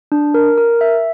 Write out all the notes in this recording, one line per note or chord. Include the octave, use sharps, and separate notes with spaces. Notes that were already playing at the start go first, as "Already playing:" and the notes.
D4
A#4
A#4
E5